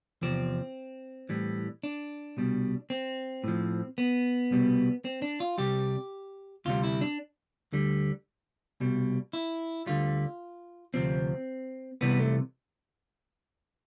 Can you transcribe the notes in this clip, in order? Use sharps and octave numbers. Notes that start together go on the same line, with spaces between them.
E2 C3 F3 C4
A2 E3 G3
D4
C2 B2 G3
C4
A2 F3
B3
C2 B2 G3
C4
D4
F4
C2 C3 G3 G4
D2 C3 G3 F4
E4
D4
D2 D3 G3
C2 B2 G3
E4
D2 D3 G3 F4
D2 C3 F3 C4
C2 C3 E3 G3 B3
A3